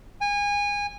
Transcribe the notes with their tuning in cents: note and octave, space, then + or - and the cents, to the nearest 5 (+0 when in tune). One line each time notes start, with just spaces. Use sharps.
G#5 -25